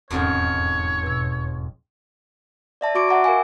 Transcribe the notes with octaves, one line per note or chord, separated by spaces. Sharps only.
E1 F2 G#2 D#3 C#4 A4 C#5
B2 E6
D5 E5 A5
F#4 C#6 D6 D7
E5 F#5 A#5 D6
A#4 F5 G#5